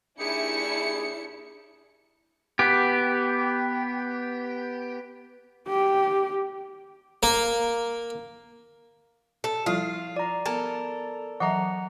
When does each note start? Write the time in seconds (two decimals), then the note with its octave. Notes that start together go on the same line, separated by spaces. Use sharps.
0.20 D#2 D4 E4 G4 G#4 C#7
2.59 B3 G4
5.69 G4
7.23 A#3
9.44 A4
9.66 F3 G3 E4 F4 F5
10.16 D5 A#5
10.46 B3 A4 A#4
11.40 E3 F#3 E5 F#5 A#5